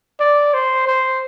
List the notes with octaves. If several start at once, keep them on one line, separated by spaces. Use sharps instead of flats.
D5
C5
C5